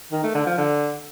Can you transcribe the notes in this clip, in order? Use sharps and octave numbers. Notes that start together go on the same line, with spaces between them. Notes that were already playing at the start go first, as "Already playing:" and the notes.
D#3
A3
D3
F3
D3